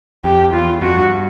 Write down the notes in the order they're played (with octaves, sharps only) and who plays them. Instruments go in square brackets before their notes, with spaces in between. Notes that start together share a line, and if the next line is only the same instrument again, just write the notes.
[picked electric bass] F2 [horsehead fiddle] G4
[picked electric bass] E2 [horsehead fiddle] F4
[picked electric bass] F2 [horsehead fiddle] F#4
[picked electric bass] G2